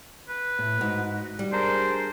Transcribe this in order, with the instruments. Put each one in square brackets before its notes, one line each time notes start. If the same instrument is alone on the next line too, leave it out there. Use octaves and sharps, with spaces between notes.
[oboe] B4
[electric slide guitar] A2
[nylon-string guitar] G#2 [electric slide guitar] F#4
[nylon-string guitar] G3
[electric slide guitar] D4 G#4 A#4 [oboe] C5